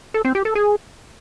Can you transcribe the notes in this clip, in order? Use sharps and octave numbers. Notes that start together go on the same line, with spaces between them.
A4
C4
G4
A4
G#4